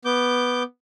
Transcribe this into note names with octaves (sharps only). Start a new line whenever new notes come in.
B3 D6 G6